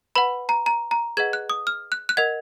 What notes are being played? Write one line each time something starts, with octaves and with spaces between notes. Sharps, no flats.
B4 F#5 B5
A#5
A#5
A#5
G#4 B4 D#5 F#5 G#6
F#6
D#6
F6
F#6
F#6
A#4 D#5 F#5 G#6